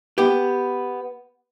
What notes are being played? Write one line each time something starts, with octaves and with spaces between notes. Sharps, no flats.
B3 G4